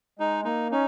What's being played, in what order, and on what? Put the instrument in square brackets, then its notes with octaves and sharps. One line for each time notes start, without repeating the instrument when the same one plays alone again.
[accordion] G#3 [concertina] D#4
[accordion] A#3 [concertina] D#4
[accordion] C#4 [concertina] D#4